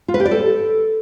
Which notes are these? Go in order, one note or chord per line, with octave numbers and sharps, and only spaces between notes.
F4
B4
G4
D5
A4